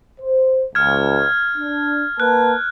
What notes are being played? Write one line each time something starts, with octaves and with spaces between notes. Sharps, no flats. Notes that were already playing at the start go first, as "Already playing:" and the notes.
C5
C#2 F6 G#6
D4
A#3 B4 A5 F#6